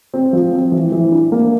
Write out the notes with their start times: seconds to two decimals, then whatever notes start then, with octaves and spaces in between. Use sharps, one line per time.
0.14 C4
0.33 F3
0.53 C4
0.72 E3
0.92 E3
1.12 D4
1.32 A#3